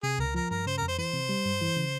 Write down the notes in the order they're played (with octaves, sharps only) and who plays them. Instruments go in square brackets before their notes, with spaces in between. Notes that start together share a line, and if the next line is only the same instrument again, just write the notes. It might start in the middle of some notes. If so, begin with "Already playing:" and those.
[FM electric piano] C3 [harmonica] G#4
[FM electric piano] C#2 [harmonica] A#4
[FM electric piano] F3 [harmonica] A#4
[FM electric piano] G2 [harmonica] A#4
[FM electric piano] C#3 [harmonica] C5
[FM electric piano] F2 [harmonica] A#4
[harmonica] C5
[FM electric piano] E3 [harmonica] C5
[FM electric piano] C3
G3
G2
E3
C#3